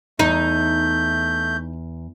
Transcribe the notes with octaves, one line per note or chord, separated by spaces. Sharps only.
E2 A3 D#4 G6